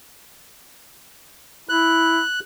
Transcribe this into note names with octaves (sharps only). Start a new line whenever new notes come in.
E4 F#6